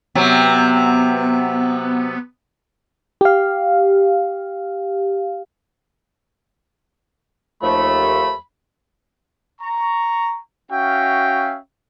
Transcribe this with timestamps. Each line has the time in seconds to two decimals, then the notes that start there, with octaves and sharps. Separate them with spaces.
0.15 C3 F#3 B3
3.21 G4 F5
7.63 D#2 F3 A3 B5
9.61 A#5 C#6
10.71 C#4 F#4 E5 F5 G5